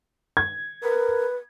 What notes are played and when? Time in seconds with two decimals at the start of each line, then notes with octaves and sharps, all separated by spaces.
0.37 G#6
0.83 A#4 B4